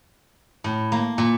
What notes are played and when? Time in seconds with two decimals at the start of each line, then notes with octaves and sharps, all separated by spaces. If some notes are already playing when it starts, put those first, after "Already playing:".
0.64 A2
0.92 A#3
1.18 A#2